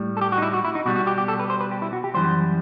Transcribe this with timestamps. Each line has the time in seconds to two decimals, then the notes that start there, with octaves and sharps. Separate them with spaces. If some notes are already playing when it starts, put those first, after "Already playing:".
Already playing: A2 G3
0.17 A4
0.21 G4
0.32 F#4
0.38 D#4
0.42 E4
0.54 F#4
0.65 E4
0.75 D#4
0.86 B2 G3 F#4
0.96 F#4
1.07 G4
1.18 G4
1.28 A4
1.40 B4
1.50 C5
1.61 B4
1.71 G4
1.82 E4
1.93 F#4
2.04 G4
2.14 F#2 E3 G3 C5